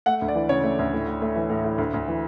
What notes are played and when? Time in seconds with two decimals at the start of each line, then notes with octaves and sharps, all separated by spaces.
0.06 A3 F#5
0.22 D2
0.28 D5
0.35 E3
0.49 C#3 C#5
0.63 A3
0.79 D2
0.93 A2
1.07 A2
1.22 A3
1.36 E3
1.50 A2
1.64 A2
1.78 D2
1.94 D2
2.08 E3